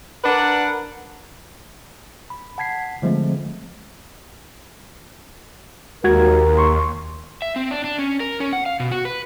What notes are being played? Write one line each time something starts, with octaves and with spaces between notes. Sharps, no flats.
D4 A#4 B4 D5 F#5
B5
F#5 A5 G#6 B6 C7
D3 F3 G#3 A3 C4
D#2 G#3 F#4 A#4 G#6
C6 C#6
E5
C4
D4
D4
C#4
A#4
C#4
F#5
F5
B2
F#4
B4